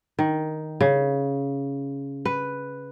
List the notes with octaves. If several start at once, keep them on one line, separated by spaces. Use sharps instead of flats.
D#3
C#3
B4